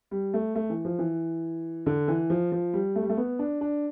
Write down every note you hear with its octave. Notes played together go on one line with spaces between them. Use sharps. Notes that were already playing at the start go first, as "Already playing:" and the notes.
G3
A3
A3
E3
F3
E3
D3
E3
F3
F3
G3
A3
G3
A3
B3
D4
D4